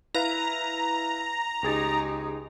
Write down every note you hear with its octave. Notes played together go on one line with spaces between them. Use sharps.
E4 B4 F5 A#5
C#2 D#4 G4 G#4 A6